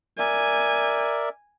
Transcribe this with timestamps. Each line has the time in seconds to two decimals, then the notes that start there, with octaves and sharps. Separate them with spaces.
0.19 A#4 D5 E5 G#5